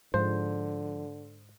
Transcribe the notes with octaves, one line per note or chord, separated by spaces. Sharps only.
G#2 D3 F3 C5